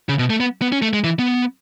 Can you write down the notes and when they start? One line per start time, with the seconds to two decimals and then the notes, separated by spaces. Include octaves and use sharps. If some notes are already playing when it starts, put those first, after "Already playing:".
0.09 C#3
0.19 B2
0.30 A3
0.40 B3
0.62 B3
0.72 C#4
0.82 A3
0.93 G#3
1.04 E3
1.19 B3